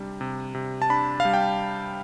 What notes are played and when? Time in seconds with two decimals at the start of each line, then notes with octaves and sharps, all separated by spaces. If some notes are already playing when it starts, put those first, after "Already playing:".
Already playing: C3 G3 D4
0.21 C3
0.55 C3
0.82 A5
0.90 D4 B5
1.20 F5
1.25 G3
1.33 G5